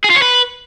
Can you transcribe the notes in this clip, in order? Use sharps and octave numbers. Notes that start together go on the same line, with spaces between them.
G#4
F4
C#5
B4